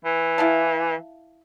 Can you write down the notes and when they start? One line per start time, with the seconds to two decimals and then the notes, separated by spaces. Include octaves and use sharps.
0.05 E3
0.38 E4 F5 A5